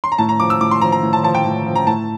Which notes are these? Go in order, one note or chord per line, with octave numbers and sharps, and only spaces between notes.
C6
A#5
A2 A5
A#5
F3 D6
E6
A2 D6
C6
F3 A#5
A#5
A2
A5
F3 A5
G5
A2
F3
A#5
A2 A5